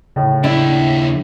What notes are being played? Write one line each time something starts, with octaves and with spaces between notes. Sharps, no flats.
A2 C#3
D#2 D4 E4 E5